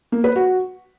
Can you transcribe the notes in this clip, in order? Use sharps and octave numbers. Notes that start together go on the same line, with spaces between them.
A#3
B4
F#4